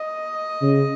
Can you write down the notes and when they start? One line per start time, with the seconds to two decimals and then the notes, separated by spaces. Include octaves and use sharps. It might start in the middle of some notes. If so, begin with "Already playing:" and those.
Already playing: D#5
0.62 C#3